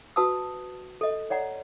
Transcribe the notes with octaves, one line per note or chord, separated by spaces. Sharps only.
F#4 B4 A5 D#6 E6
A4 D#5
C#5 D5 F#5 A#5